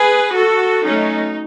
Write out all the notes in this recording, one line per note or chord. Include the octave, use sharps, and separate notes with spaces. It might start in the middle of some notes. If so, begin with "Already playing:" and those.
Already playing: G#4 B4
F#4 A4
F#3 A3 C#4 D#4